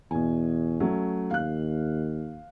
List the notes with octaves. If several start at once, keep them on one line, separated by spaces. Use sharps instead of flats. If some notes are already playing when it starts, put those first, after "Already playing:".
E2 B2 G#5
F#3 A3 C#4
D#2 F5 F#6